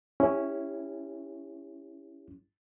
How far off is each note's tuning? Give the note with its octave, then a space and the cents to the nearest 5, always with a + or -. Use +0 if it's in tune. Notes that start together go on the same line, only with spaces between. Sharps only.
C#4 +0 E4 +0 G4 +30